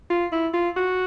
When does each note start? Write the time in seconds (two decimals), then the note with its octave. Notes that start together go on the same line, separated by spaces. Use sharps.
0.10 F4
0.32 E4
0.54 F4
0.76 F#4